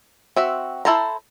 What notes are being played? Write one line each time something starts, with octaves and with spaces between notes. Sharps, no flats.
C4 F#4 E5
E4 A4 C5 A5 A#5